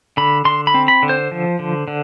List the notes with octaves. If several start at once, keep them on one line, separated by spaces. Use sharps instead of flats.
D3 B5
D3 C6
B5
C4
B5
D3
C5
F3
D3
D3